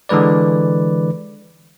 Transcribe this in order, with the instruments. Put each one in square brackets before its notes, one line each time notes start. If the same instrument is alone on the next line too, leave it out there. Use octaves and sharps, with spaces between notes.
[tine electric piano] D3 E3 G#3 B4 D5